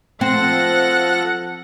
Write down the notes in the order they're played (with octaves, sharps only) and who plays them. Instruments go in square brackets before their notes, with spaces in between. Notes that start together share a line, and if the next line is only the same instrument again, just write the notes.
[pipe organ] F3 A4 A#6 [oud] C4 [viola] F#5